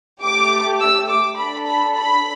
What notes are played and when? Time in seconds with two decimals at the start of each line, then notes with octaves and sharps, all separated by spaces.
0.23 A3 G4 D6
0.80 E6
1.09 D6
1.37 D4 A4 B5
1.66 B5
1.95 B5